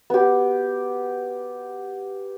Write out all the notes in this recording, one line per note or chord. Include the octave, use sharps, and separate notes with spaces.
B3 G4